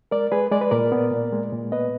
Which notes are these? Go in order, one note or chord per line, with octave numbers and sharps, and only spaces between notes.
G#3 A#4 D5
G#3 G#4 B4
G#3 D5
B4
A#2 A#4 D5
B3
A#2
G#3
A#2
B3 B4 D#5